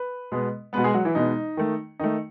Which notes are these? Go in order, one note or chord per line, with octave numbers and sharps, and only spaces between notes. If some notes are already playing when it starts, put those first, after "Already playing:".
Already playing: B4
B2 G#3 B3
G#3 B3 B4
B2 F#4
G#3 G#4
F#3 F#4
E3 E4
B2 G#3 B3 D#4
D#3 A3
D#3 A3 D#4